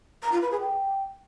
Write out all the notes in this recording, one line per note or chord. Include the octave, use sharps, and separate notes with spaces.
A#5
F4
B4
G#4
G5